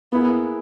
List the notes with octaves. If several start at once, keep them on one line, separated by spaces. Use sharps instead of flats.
A#3 B3 E4 G#4